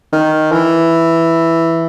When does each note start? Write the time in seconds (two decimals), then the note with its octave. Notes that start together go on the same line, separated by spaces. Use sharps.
0.13 D#3
0.52 E3